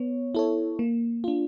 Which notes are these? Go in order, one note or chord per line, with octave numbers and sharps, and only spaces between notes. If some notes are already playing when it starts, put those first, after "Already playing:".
Already playing: B3 C#5
E4 A4 C#5
A#3
D4 F4